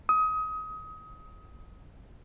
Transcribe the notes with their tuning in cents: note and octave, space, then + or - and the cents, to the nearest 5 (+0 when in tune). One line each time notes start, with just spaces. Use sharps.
D#6 +25